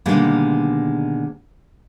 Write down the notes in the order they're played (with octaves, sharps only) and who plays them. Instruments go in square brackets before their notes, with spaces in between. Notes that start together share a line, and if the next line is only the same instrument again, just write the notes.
[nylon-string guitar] B2 D3 D#3 G3 G#3 A#3